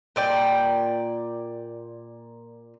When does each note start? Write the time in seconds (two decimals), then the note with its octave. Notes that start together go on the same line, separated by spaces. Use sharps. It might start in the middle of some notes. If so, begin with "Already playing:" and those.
0.16 A#2 D5 G5